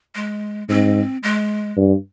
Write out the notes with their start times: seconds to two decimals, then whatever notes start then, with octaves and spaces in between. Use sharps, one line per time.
0.15 G#3
0.69 G#2 C4
1.23 G#3
1.77 G2